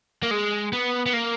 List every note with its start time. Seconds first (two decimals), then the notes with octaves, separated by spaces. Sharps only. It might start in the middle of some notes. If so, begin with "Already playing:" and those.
0.23 A#3
0.31 G#3
0.73 B3
1.06 B3
1.13 A#3